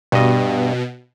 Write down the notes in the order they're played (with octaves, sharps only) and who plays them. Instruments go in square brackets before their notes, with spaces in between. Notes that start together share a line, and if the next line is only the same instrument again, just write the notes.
[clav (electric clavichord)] G2 D#5 [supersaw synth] B2